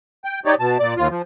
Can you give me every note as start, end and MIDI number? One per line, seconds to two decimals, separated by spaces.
0.25 0.40 79
0.45 0.55 63
0.45 0.55 67
0.45 0.55 73
0.45 0.55 74
0.60 0.78 47
0.60 0.78 81
0.79 0.94 46
0.79 0.94 74
0.97 1.08 39
0.97 1.08 65
1.10 1.22 53